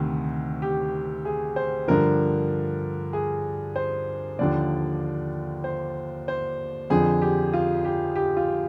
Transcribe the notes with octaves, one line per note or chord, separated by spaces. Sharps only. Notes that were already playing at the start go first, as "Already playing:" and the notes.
Already playing: D2 C3 D#3
G4
G#4
C5
G2 D3 F3 A#4
G#4
C5
D#2 D3 F3 D5
C5
C5
F2 D3 F3 G#4
G4
F4
G4
G4
F4